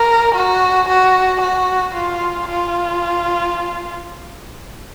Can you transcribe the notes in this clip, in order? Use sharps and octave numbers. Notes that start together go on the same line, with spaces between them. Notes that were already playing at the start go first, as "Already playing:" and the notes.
Already playing: A#4
F#4
F#4
F#4
F4
F4